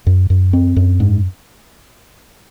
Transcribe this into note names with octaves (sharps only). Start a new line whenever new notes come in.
F#2
F#2
C4
F#2
G#2